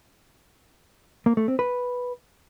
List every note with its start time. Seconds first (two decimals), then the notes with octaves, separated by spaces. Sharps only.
1.26 A#3
1.37 A3
1.48 C4
1.59 B4